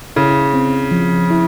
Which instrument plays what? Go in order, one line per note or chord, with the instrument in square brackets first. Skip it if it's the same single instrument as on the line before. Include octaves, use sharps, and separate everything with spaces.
[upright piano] C#3 [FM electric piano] E4
[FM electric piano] C4
F3
E4